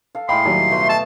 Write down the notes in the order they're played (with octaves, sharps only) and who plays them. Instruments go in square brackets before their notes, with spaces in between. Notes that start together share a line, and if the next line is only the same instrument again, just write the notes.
[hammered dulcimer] A4 F5
[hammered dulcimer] A2 G#3 D#5 [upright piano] F5 G5 B5 [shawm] C6
[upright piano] D#2 F#3 G3
[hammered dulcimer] B2 A3
[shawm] A5